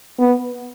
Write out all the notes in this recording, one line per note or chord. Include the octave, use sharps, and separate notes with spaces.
B3